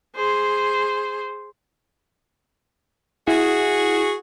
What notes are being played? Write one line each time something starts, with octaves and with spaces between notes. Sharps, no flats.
G#4 C5
E4 F#4 G#4